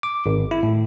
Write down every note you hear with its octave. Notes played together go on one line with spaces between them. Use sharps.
D6
G#1
E4
A2